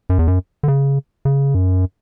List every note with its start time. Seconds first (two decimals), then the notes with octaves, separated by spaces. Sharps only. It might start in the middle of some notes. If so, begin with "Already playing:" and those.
0.10 F#2
0.19 E2
0.27 F#2
0.63 D3
0.68 C#3
1.25 C#3
1.55 F#2